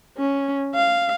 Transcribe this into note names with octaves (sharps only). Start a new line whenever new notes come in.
C#4
F5